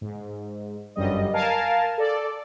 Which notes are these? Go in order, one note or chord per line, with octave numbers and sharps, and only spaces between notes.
G#2
G1 F#2 G3 D#5
A#4 F5 G#5 A5
A4 D5